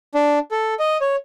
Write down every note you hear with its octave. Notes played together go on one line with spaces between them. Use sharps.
D4
A4
D#5
C#5